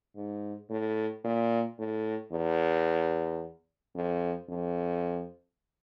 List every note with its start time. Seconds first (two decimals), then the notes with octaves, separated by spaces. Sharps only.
0.16 G#2
0.70 A2
1.25 A#2
1.78 A2
2.32 E2
3.96 F2
4.49 F2